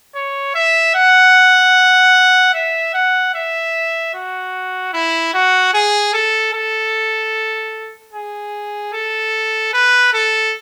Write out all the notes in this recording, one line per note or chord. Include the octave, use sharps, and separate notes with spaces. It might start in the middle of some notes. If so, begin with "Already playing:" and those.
C#5
E5
F#5
E5
F#5
E5
F#4
E4
F#4
G#4
A4
A4
G#4
A4
B4
A4